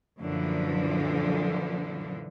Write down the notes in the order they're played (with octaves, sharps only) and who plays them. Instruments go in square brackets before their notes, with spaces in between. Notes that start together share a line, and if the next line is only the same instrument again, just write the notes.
[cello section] F#2 A#2 D3 E3 F3